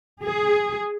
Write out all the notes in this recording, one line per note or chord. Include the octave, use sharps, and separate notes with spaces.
G#4